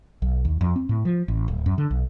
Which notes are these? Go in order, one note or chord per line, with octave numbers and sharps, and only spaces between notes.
B1
D#2
F2
C4
A2
F3
A1
D1
F#2
D3
B1